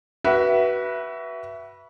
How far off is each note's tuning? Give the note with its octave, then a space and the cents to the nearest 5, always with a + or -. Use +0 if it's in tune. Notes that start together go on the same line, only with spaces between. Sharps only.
F#4 +25 B4 -15 E5 +10